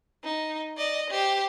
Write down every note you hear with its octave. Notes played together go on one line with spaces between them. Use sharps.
D#4
D5 D#5
G4 C5